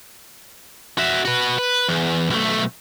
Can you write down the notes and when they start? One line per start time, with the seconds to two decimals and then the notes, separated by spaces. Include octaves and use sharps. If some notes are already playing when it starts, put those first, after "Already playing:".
0.98 F#4 E5
1.25 F#4 B4
1.58 B4
1.88 E2
2.30 B1 A3